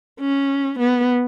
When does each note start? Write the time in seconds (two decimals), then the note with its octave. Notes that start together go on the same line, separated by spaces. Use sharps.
0.20 C#4
0.79 B3